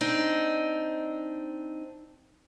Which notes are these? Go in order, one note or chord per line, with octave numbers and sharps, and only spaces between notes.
C4 D4 D#4